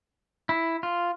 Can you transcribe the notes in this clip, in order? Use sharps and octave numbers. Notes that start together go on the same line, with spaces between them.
E4
F4